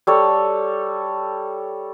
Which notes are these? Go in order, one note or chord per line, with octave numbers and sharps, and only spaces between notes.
G3 A4 C#5